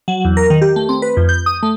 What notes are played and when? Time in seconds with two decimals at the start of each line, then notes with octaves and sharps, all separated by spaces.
0.08 F#3
0.25 E2
0.37 A#4
0.50 D#3
0.61 G4
0.76 A3
0.89 C4
1.02 B4
1.17 F2
1.29 G6
1.46 D#6
1.63 A3